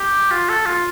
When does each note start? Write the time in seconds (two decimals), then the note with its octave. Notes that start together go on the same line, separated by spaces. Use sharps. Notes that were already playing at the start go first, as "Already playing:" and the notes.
Already playing: G4
0.31 F4
0.49 A4
0.66 F4